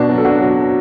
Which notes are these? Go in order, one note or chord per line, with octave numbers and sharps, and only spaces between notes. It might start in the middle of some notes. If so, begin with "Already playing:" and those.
Already playing: B2 D4 F#4
F#3
A4
D4 F#4
F#3